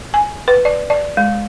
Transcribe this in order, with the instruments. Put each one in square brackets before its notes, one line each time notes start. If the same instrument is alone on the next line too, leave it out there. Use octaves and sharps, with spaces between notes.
[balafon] G#5
B4
D5
D5
G#3